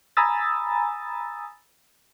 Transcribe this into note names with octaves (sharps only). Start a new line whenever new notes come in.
G#5 A#5 B5 D#6 E6 A6